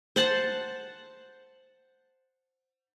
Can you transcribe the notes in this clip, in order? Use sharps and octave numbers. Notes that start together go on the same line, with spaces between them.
C5 F#5 A5